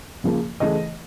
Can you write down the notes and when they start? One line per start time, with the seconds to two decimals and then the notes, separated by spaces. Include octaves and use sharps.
0.24 C#3 F3 A#3
0.60 C#3 E3 A3 D#5